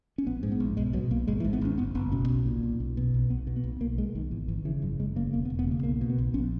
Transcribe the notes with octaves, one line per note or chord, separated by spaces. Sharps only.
C#4
A#1 B3
G#2
B3
A#1
B1 G#3
B2 F#3
B1 A#3
G#1 G#3
E3
G#2
B3
G#1 C#4
F#1 B3
F#1 B3
B2 C#4
B1
A#2
B1
B1
B2
B1
B1 B3
B2
B3
B1
B1 A#3
B2 G#3
B1 D#3
G#1 E3
G#1 E3
C#3 E3
F#1 F#3
F#1 G#3
C#3 A#3
E1 A#3
B3
E1
B3
C#3 A#3
B1 A#3
B2
B3
B1
A#1 C#4